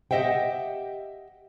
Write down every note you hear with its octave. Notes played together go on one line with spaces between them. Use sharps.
G4 D#5 E5 F#5 G5